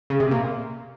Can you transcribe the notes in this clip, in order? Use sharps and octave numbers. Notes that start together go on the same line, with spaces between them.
C#3
C3
A#2